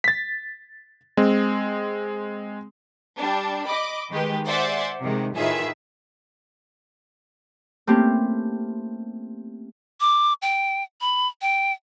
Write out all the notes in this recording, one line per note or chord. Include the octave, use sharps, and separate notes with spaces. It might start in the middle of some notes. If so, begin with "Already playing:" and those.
A6 B6
G#3 C4
G3 D4
D#5 B5 D6
D#3 G#3 G4 B4
C5 D5 E5 F#5 G#5 C6
C3 D#3 G#3
A2 D#3 F4 G#4 B4 E5
A3 A#3 C4 C#4 E4 G4
D6
G5
B5
G5